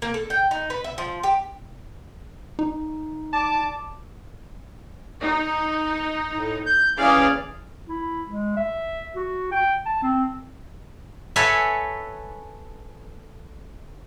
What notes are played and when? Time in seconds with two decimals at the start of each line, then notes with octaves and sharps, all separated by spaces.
0.02 A#3
0.14 A4
0.30 G5
0.51 D#4
0.70 B4
0.84 E5
0.98 F3
1.23 G4
2.59 D#4
3.33 D5 A5 D6
5.21 D#4
6.36 A2
6.66 G6
6.99 E3 C#4 G#4 D5 F5
7.89 E4
8.28 G#3
8.57 E5
9.16 F#4
9.51 G5
9.86 A5
10.02 C4
11.36 A4 B4 C#5 E5 G#5